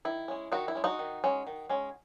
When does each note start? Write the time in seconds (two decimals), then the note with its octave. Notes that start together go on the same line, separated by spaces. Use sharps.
0.05 D#3 E4
0.28 G#3 C#4
0.52 D#3 D#4 F#4
0.68 E4
0.75 G#3 C#4
0.84 D#4 F#4
0.99 D#3
1.24 G#3 C#4
1.47 D#3
1.69 G#3 C#4